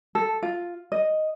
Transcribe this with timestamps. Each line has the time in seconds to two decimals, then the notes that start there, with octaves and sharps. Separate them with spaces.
0.15 A4
0.43 F4
0.92 D#5